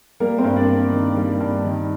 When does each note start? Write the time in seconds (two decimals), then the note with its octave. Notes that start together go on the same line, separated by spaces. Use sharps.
0.20 G3 A#3 A#4
0.38 C4 C5
0.44 G2
0.56 D4 D5
0.68 A#3
0.92 D#3
1.17 G3
1.40 G2
1.64 D#3